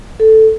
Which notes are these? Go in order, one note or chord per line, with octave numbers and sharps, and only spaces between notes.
A4